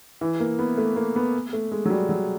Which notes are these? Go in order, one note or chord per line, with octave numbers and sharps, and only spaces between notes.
E3
A#3
B3
A3
A#3
B3
A3
G#3
F#3
G3
F#3